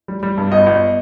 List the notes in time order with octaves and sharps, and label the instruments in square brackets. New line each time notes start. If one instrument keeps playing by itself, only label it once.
[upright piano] G3
G3
G2
[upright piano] G1 [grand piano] D#5
[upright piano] G1